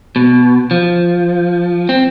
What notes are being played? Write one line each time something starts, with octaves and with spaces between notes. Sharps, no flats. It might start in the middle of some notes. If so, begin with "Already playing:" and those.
B2
F3
C4